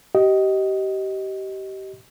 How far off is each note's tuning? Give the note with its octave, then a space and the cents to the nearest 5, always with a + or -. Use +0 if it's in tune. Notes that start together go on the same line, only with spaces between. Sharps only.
G4 -30 D#5 +10